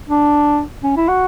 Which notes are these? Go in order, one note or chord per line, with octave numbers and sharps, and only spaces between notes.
D4
C#4
E4
F#4